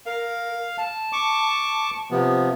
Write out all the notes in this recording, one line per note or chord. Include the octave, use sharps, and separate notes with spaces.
A#4 F5
A5
C#6 D6
C3 F3 B3